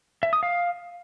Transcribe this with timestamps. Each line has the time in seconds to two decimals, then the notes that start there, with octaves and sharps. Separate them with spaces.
0.23 E5
0.33 D#6
0.43 F5